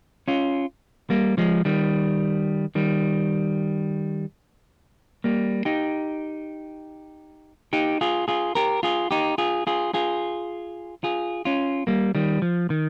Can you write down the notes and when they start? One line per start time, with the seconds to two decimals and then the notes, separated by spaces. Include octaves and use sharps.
0.28 C#4 F4
1.10 G3 A#3
1.38 F3 G#3
1.65 D#3 G3
2.75 D#3 G3
5.24 G3 A#3
5.65 D#4 G4
7.73 D#4 G4
8.01 F4 G#4
8.28 F4 G#4
8.55 G4 A#4
8.83 F4 G#4
9.11 D#4 G4
9.38 F4 G#4
9.67 F4 G#4
9.94 F4 G#4
11.04 F4 G#4
11.45 C#4 F4
11.87 G3 A#3
12.15 D#3 G3
12.42 F3
12.70 D#3